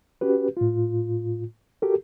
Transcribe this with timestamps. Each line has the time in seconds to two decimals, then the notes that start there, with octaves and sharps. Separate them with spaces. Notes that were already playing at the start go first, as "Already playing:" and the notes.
0.21 C#4 F#4 G4 B4
0.57 A2 F4
1.82 F#4 G4 A4 A#4